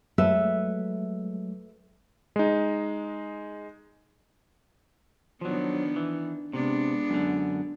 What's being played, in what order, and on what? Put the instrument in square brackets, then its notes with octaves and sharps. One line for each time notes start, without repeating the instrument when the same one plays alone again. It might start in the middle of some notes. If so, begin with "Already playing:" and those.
[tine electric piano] F#3 G#3 A3 [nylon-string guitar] A4 B4 E5
[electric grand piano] G#3 D#4
[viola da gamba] D#3 B3 D4 [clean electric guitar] F3 F#3
[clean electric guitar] E3
[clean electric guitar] C3 [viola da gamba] G#3 B3 D4
[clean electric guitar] F#2 D3